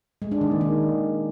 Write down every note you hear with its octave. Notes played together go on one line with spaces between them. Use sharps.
G#3
D4
D#3
A#3
D#3